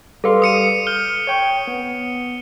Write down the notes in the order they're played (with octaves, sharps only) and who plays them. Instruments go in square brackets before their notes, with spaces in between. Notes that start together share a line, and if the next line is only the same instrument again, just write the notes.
[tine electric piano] G3 F5 C6 [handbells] A4 B4
[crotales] D#6 C#7 D#7
[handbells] F6 [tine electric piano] G6 [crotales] G7
[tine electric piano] C#5 G5 C#6
B3